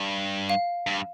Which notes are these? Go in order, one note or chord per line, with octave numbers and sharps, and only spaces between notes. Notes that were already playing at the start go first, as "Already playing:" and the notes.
Already playing: G2
F5
G2